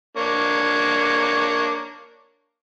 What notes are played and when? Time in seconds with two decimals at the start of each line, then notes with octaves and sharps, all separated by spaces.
0.17 A#3 D4 C#5